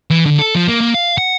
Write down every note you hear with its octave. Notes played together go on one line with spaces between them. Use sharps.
E3
D3
A4
F3
A#3
A#3
F5
F#5